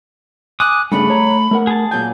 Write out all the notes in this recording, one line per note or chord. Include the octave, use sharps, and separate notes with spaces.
G#5 D6 D#6 F#6
G2 C#3 A3 D4 B5
C#5 A#5
A3 A#4 F#5
G#4 A5
A#2 F#3 G#5 G6